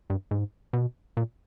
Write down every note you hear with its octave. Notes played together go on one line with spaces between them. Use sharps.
G2
G#2
B2
A#2